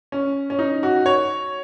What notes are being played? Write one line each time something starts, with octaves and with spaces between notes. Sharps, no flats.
C#4
C#4
D#4
F#4
C#5